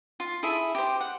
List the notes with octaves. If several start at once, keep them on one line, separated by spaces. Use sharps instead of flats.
F4
E4 G#4 A4 E5
G4 C5
F#5